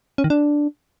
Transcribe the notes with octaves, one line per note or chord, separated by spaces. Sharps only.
C#4
D#3
D4